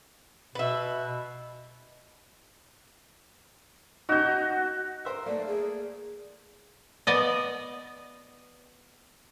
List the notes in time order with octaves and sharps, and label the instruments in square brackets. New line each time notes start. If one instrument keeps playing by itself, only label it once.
[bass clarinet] B2 [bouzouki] B4 E5
[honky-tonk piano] D#4 G6 [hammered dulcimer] F#4
[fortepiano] A#4 C5 E5
[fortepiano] A3 A#3 [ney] D5
[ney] G#4
[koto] B3 D5 D#5